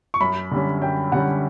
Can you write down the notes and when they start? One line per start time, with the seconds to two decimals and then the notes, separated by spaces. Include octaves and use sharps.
0.14 C#6
0.21 F#2 B5
0.51 D3 G3 C#4
0.82 F#2 G5
1.12 D3 G3 C#4 F#5